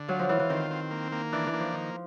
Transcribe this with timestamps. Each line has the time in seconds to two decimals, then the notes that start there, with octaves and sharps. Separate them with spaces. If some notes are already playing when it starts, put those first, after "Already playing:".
Already playing: D3
0.08 F#3 F4
0.19 F3
0.29 E3 F4
0.40 E3
0.49 D#3 C4
0.71 C4
0.91 A#3
1.12 A#3
1.32 E3 D4
1.46 E3
1.54 A#3
1.60 F3
1.73 D#3